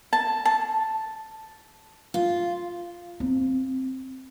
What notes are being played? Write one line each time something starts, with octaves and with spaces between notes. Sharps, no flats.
A5
A5
F4
C4